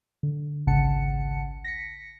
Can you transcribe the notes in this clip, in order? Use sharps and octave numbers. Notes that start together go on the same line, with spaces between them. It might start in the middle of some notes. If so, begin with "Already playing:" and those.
D3
G#1 C#2 C#3 F#5 A5 C#7
A#6 B6 C#7